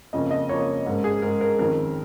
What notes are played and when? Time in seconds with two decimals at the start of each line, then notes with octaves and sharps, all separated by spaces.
0.13 F2 C#3 A#3 C#4 D#5
0.31 D#5
0.49 F2 C#3 A#3 C#4 C#5
0.86 G#2 G#3 C#4 A#4
1.04 G#4
1.22 G#2 G#3 C#4 A#4
1.41 A#4
1.59 F2 D#3 C#4 A#4